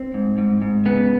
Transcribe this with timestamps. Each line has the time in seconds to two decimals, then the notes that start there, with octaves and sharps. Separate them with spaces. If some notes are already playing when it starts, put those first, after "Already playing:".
Already playing: C4
0.14 G#2
0.38 G#2
0.62 G#2
0.86 C#3 B3